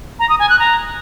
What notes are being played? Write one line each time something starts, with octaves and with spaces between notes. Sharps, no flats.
A#5
D#6
G#5
F#6
A#5